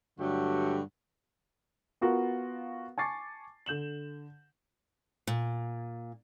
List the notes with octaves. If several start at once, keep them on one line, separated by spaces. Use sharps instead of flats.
G2 D3 F#3 A3 F#4 G4
B3 F4 F#4 A#4
G#5 A5 C#6 D6 A6 C7
D3 G6 E7 F#7
A#2